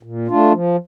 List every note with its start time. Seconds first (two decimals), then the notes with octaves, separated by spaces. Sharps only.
0.03 A#2
0.28 A3 D4 F4
0.52 F3